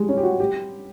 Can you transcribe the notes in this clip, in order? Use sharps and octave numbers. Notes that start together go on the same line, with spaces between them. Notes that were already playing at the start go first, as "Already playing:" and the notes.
Already playing: G3 G#3
C#4
G4
F#4
G4